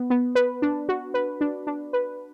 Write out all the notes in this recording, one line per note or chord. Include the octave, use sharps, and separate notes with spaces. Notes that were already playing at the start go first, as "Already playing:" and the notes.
Already playing: B3
B3
B4
D4
F#4
B4
D4
D4
B4